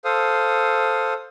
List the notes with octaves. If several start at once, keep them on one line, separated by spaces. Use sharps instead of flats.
A4 C5 F5 D#6